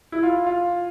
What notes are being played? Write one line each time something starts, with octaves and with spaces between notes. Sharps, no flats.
E4
F4
F4